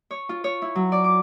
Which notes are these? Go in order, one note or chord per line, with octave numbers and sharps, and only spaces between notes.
C#5
F4
C#5
E4
F#3
D5
D6